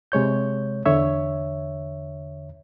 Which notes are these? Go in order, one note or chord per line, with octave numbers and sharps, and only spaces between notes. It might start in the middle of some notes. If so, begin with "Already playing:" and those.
C3 G#3 C#5 G6
E2 D3 C#5 E5